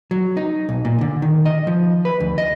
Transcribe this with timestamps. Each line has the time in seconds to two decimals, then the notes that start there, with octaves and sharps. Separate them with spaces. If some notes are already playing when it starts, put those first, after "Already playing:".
0.11 F#3
0.37 D#4
0.69 B1
0.85 A#2
1.01 D3
1.22 D#3
1.46 D#5
1.67 F3
2.05 B4
2.20 D2
2.38 D#5